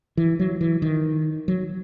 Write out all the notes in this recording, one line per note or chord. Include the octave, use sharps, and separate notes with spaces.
E3
F#3
E3
D#3
F#3